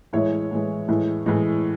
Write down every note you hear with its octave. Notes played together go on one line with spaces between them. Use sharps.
A2 E3 G#3 C#5 E5
A2 E3 G#3
A2 E3 G#3
A2 E3 G#3